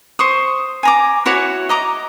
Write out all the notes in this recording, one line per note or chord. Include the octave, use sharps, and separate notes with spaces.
C5 C#6 D#6
G#5 A#5 D6
E4 F#4 C#5 F#5
D#5 A#5 D6